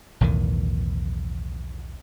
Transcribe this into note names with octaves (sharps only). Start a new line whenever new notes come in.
B1 E2 A2 D#3